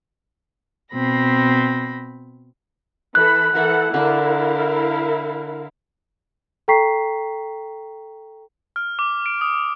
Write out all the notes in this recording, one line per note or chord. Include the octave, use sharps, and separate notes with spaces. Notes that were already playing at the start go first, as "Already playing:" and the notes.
B2 C4 B5 A#6
E3 A4 B5 F#6
E3 E4 A4 A#4 F#5
D3 D4 E4 A#4 F5
A4 G5 A#5 C#6 B6 C7
F6
D6
D7
D#6